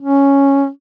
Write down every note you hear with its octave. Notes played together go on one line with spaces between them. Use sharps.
C#4